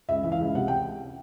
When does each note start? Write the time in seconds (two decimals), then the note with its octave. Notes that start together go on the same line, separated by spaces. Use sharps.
0.09 C#2 E5
0.23 E3 E5
0.32 F5
0.40 C#2
0.55 C3 F#5
0.68 G5